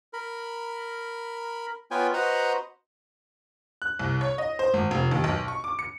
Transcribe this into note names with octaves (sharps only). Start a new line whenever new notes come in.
A#4 B5
B3 F4 B4 C#5 G5 G#5
F#4 B4 C5 D#5 F#5 A#5
F#6
C2
C#5
D#5
C5
G#1
F1
D#2
B1
C#6
D6
C#7